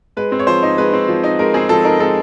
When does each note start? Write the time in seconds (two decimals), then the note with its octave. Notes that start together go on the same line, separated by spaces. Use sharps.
0.17 G#3 B4
0.32 C4
0.39 C#5
0.47 F3 C5
0.63 D#4
0.78 G#3 B4
0.93 C4
1.08 F3
1.24 D#4
1.39 G#3 A#4
1.54 C4 G#4
1.69 F3 A4
1.84 D#4 A#4
2.00 G#3 A4